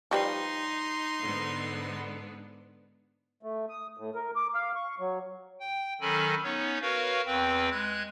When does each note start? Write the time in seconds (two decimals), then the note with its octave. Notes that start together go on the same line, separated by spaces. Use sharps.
0.11 F3 G3 D#4 B4 C6
1.20 G#2 D3 B3
3.43 A3
3.69 D#6
3.98 A2
4.15 A#4
4.36 D6
4.54 F5
4.76 C#6
4.99 F#3
5.60 G5
6.01 D#3 F#3 C#4 A4 G#5 B5
6.43 B3 C#4 D#4 C#5
6.82 F#4 A#4 B4 C#5 F5
7.26 E2 C4 B4 G5
7.72 G#3 F#6 G#6